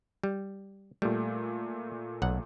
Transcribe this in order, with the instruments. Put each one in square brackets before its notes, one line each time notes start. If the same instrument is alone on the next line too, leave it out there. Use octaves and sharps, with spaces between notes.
[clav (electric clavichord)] G3
[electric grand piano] A#2 A3 [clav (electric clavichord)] G3
[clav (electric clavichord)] B1 F#5